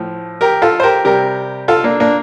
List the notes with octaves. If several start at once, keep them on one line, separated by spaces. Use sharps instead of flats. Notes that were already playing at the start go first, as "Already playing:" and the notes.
Already playing: A2 F3
G4 A#4
F4 A4
C5
G4 A#4
C3 G3 G4 A#4
F4 A4
A#3 D4
A#3 D4